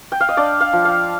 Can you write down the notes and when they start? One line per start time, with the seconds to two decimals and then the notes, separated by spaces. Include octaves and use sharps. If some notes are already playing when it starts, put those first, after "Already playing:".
0.12 G5
0.20 F5
0.29 D#5
0.37 D4 D5
0.61 F5
0.73 F3
0.85 F5